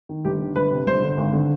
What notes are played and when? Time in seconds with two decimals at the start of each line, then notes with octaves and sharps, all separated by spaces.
0.09 D#3
0.25 G1 G4
0.41 D3
0.56 G1 B4
0.72 C3
0.87 G1 C5
1.02 D3
1.17 G#1
1.33 D3